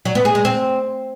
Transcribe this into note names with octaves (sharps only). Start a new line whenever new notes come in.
F#3
B3
G#4
G#3
C4